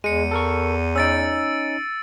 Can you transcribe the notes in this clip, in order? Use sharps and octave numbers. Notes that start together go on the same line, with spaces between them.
E2 G#3 C#7 D#7
A4 A#4 C#6
C#4 D#4 E6 A6 D7